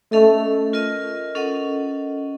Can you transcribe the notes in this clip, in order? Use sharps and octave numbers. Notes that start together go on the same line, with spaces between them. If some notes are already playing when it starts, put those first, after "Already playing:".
A3 C#4 A4 D#5
F4 A#4 D#5
C#4 A4 D#5 F#5